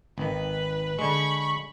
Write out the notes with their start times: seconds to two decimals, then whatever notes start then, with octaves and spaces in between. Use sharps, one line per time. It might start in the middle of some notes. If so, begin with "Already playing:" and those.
0.18 G#1 D#3 B4
0.99 D3 G#3 B5 C#6